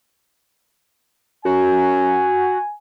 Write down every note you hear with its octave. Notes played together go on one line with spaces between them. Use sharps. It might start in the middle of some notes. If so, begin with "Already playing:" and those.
F#2 F#4 G#5